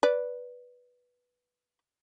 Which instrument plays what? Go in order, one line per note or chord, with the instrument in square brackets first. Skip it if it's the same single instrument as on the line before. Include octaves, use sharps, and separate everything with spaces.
[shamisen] B4 D5